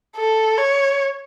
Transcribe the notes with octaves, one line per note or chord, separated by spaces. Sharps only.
A4
C#5